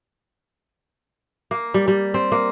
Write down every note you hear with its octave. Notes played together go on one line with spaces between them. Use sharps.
A#3
G3
G3
C4
A#3